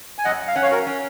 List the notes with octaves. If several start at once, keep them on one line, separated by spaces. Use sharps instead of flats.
G#5
F#2 D#5 F#5
F5
C#4 F#5
C#5 F5
F#4 A#4
C#4